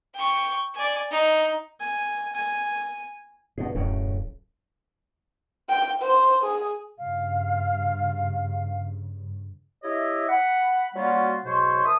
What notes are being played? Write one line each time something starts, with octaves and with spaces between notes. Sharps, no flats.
G5 C#6
D5 G#5
D#4
G#5
G#5
G2 B2 G#4
D#1 F#2 A2 C#3
G5
C5
G#4
G2 C#3 F5
E4 G4 C#5 D#5 E5
F#5 B5
F#3 G3 A#3 C#4 F4 F#4
G#2 B2 F#3 C5 C#5 C6
A#4 E5 A5 D#6